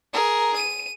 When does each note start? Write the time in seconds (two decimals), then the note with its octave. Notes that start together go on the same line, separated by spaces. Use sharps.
0.13 G#4 A#4
0.56 D#7